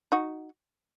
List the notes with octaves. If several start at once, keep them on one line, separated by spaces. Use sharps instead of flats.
D#4 F#4